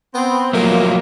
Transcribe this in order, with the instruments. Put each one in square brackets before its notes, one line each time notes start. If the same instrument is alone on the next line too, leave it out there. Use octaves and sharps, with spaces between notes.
[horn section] B3 C4
[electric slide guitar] F3 F#3 A3 [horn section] A#3